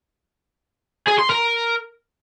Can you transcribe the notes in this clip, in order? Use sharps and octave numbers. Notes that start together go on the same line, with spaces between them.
G#4
C6
A#4